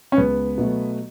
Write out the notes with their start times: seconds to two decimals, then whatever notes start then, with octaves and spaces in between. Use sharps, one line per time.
0.12 C#4
0.17 C#2 B3
0.58 B2 F#3 A3